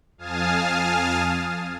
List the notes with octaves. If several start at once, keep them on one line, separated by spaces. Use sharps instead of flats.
F2 F5 G#5 A5 D#6 F6